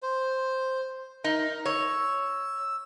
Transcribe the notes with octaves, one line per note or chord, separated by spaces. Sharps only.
C5
D#4 A#4
C#5 E6